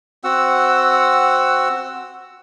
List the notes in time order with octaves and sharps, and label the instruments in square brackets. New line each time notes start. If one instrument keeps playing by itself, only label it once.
[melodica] C4 F#4 F#5 E6